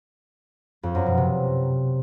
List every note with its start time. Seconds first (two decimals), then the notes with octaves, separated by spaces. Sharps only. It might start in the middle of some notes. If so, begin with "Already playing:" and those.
0.83 F2
0.95 F#2
1.06 B2
1.18 C3